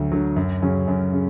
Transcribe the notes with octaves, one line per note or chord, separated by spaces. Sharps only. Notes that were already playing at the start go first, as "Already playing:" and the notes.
Already playing: D2 D3 F#3
D3 F#3
F#2
C#3 F#3 C#4
F#2
C#3